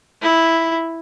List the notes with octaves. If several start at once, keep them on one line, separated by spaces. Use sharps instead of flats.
E4